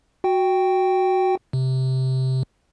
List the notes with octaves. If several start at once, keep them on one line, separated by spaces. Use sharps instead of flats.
F#4 G5
C3